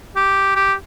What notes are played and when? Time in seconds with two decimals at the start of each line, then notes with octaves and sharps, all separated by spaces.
0.16 G4
0.56 G4